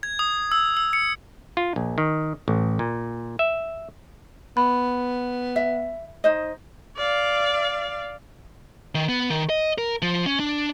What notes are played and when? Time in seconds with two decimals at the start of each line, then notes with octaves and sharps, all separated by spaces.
0.03 G#6
0.19 D#6
0.52 E6
0.77 E6
0.93 C#7
1.57 F4
1.76 A#1
1.98 D#3
2.48 A1
2.79 A#2
3.39 E5
4.57 B3 B5
5.56 E5
6.24 D#4 C5 D#5
6.97 D5 F5
8.95 D#3
9.09 B3
9.30 D#3
9.50 D#5
9.78 A#4
10.02 F3
10.26 C#4
10.40 D4